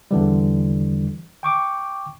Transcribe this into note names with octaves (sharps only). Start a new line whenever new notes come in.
E2 D3 E3 G3
G5 C#6 D6